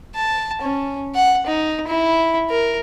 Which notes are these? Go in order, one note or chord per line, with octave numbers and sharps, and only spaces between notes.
A5
C#4
F#5
D#4
E4
A#4